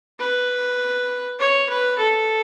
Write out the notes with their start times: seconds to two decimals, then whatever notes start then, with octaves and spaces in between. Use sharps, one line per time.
0.19 B4
1.39 C#5
1.69 B4
1.98 A4